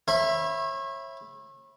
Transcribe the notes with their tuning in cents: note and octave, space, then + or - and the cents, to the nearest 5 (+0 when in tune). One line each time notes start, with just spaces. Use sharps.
C#5 -35 E5 +5 B5 +0